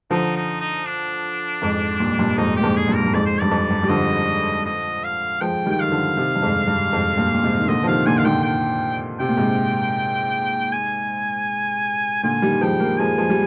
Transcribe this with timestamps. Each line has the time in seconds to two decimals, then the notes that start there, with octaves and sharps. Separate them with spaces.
0.11 D3 F3 D#4
0.36 D#4
0.61 D#4
0.86 D4
1.62 F2 G#2
2.00 G2 A#2
2.19 G2 A#2
2.37 F2 G#2 D#4
2.56 A#2 G4
2.63 F2 G#2
2.76 G#4
2.88 G2 A#2
2.95 A#4
3.04 G2
3.14 F2 G#2 D5
3.26 C5
3.40 G2 D5
3.51 F2
3.71 G2
3.83 G3
3.89 D3 F3 D#5
4.65 D#5
5.04 F5
5.41 F3 G#3 G5
5.66 D#3 G3
5.72 G5
5.80 D#3 F5
5.91 D3 F3
6.17 C3 D#3
6.36 G2
6.42 F2 G#2
6.68 G2
6.93 F2 G#2
7.18 G2 A#2
7.34 A#2
7.43 G#2 C3
7.58 D#3
7.68 A#2 D3 D#5
7.83 F3
7.87 C3 D#3 F5
8.06 A#2 D3 G#5
8.17 D#3 F5
8.25 A#2 D3 G5
8.44 G5
9.20 C3 G5
9.29 A#2
9.37 G#2 C3
10.72 G#5
12.23 A#2 D3 G#5
12.42 D#3 G3
12.61 F3 G#3 G5
12.80 G3 A#3
12.99 F3 G#3 G#5
13.18 F3 G#3
13.30 G3